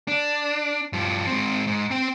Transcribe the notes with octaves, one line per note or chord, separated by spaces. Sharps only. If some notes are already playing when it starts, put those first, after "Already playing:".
D4
G2 F3
G#2 C4
G#2
C4 G5